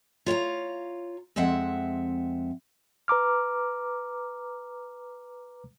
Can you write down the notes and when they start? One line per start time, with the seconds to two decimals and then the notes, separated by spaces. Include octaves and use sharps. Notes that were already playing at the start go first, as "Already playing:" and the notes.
0.26 F4 C#5 F5 A#5
1.36 F2 G#3 C4 E5 F#5
3.08 B4 A#5 D6 F6